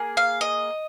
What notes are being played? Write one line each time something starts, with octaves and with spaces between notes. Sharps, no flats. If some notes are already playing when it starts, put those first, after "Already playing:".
Already playing: A#3 G#4
F5
D#5